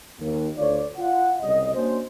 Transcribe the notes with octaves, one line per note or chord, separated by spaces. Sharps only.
D#2
D2 F4 C#5 D5
F4 F#5
C2 C#3 G3 D#5
A#3 C#4 D4 F#4 C5